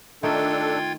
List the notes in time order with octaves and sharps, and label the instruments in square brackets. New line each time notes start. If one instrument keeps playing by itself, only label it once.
[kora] D#3 A3 D#4 [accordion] D4 A4 [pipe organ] F4 G5 G#6